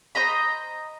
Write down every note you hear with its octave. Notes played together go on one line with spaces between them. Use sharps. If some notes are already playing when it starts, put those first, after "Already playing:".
C5 D#5 A#5 B5